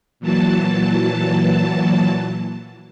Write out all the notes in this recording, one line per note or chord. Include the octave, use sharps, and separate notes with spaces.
A#2 E3 F#3 A5